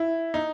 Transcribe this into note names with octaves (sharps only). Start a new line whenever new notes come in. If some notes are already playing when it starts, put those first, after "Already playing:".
Already playing: E4
D#4